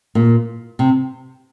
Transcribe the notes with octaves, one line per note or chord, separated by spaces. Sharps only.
A#2
C3